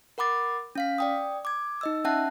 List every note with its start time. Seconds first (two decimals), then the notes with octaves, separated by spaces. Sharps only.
0.18 A#4 F#5 B5 D6 A6
0.75 C#4 F5 B6
0.98 D5 G5 D#6
1.45 D6 G#6
1.81 D#4 D#5 E6
2.04 C#4 E5 F#5 A5 F#6